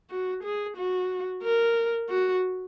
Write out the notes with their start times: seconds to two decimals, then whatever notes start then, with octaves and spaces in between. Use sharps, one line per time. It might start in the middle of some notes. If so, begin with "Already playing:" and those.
0.10 F#4
0.43 G#4
0.77 F#4
1.43 A#4
2.09 F#4